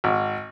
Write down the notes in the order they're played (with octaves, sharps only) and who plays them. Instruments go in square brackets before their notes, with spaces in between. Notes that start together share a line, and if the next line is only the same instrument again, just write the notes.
[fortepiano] G#1